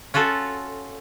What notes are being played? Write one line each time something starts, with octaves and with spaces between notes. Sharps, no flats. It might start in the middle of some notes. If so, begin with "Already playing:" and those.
C#4 F4 F#4 A4